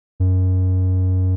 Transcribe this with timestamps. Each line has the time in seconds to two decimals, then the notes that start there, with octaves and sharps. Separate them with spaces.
0.20 F#2